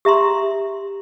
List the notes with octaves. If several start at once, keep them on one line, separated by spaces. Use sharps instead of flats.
G4 E5 A#5 C6